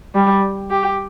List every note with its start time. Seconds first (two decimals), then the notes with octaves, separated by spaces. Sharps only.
0.15 G3
0.71 G4